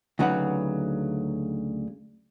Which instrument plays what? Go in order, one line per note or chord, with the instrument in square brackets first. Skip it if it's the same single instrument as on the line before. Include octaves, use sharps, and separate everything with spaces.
[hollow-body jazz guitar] D2 C#3 F#3 D#4 B4 F#5